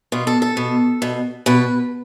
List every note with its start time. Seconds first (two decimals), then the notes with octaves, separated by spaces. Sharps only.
0.12 B2 F4
0.27 A4
0.42 A4
0.57 B2
1.02 B2
1.46 B2 B4